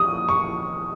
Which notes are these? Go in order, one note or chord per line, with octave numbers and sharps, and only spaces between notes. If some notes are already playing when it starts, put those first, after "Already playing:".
Already playing: D#6
C#6